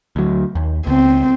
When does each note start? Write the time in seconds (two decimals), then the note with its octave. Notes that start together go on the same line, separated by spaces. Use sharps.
0.16 D2 F#3
0.55 D#2
0.87 C#2 C4